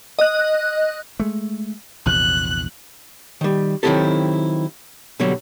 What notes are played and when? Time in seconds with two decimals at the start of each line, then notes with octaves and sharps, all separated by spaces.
0.19 D#5 F#6
1.20 G#3 A3
2.06 A#1 E2 C3 F#6
3.41 D#3 G3
3.83 D#3 F#3 C4 E4 G4 A4
5.20 B2 D3 F#3 G3